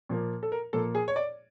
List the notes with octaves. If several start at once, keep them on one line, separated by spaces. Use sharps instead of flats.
A#2 F3 A#3
A4
A#4
A#2 F3 A#3 A4
G#4
C#5
D5